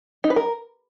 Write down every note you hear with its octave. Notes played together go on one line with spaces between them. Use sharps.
D#4
B4
A#4